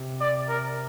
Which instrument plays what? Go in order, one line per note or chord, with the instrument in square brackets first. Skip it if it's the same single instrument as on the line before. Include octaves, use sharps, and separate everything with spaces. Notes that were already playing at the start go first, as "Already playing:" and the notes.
Already playing: [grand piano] C3
[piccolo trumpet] D5
A#4